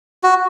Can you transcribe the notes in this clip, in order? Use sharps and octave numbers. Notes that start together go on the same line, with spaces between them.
F#4